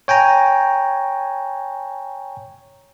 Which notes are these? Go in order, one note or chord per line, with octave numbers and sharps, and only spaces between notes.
C#5 G5 G#5 A#5